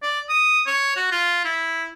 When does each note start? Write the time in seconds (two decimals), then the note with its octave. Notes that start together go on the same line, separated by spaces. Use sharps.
0.03 D5
0.29 D#6
0.66 C#5
0.96 F#4
1.12 F4
1.45 E4